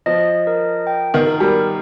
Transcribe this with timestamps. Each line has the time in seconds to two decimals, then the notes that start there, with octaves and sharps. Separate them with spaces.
0.06 F3 D#5
0.47 A#4
0.87 G5
1.14 D#3
1.27 A#4
1.40 G3